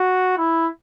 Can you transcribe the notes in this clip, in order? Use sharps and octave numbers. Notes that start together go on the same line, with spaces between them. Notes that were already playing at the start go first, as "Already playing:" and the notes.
Already playing: F#4
E4